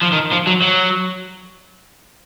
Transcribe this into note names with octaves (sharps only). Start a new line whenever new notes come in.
F3
D#3
F3
F#3
F#3